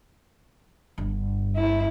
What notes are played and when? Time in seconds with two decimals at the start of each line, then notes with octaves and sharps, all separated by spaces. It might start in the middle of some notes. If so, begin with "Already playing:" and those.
0.98 G1 G2
1.56 E4